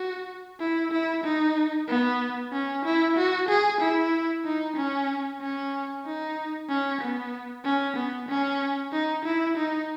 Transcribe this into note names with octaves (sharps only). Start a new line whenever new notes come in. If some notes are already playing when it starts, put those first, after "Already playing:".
Already playing: F#4
E4
E4
D#4
B3
C#4
E4
F#4
G#4
E4
D#4
C#4
C#4
D#4
C#4
B3
C#4
B3
C#4
D#4
E4
D#4